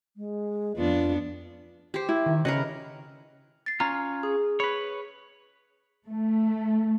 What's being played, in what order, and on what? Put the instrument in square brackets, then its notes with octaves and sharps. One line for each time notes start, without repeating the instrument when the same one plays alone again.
[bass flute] G#3
[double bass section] F2 [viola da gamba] B3 D4 [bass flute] F4
[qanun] G4 C5
[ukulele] E4
[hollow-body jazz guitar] D#3
[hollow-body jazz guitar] C#3 [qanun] A#4 B4 F#5 [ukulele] D#5
[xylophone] A6 C7
[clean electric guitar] C#4 F4 [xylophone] A#5
[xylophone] G#4
[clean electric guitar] B4 C#5 [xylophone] B5
[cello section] A3